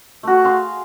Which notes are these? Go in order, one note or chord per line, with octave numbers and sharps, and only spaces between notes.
A3 F#4
G#4 F5 C6